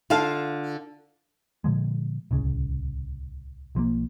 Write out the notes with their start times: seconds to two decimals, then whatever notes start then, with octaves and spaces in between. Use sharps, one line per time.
0.10 D3 F4 F5 A5
1.64 A#2 D3 F3 G#3
2.31 D1 C2 C#3
3.75 B1 F3 A3 A#3